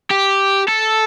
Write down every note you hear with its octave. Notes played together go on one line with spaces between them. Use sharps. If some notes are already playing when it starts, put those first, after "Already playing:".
G4
A4